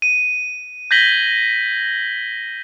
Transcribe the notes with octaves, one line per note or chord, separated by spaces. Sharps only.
D#7
G6 G#6 A#6 B6 F#7 G7